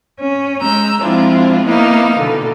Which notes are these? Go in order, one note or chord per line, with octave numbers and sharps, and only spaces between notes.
C#4
G#3 A#5 E6 G6
F3 G#3 C4 D4 E4 F4
A#3 B3 D#4 E4 F5
B2 D3 E3 A4